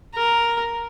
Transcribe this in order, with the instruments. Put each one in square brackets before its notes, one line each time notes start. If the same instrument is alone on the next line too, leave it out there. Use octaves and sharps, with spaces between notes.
[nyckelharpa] A#4